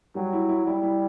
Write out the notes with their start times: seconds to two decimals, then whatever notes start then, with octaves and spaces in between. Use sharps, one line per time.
0.15 F#3 G3
0.33 E4
0.49 E4
0.66 G3 E4
0.83 E4